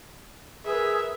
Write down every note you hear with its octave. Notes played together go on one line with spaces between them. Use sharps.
G#4 A#4 B4 E5